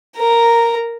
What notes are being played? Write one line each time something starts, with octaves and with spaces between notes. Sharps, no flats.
A#4 A#5